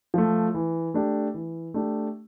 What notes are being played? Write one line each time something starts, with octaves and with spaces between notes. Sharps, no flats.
F3 A3
E3
A3 D4 G4
E3
A3 D4 G4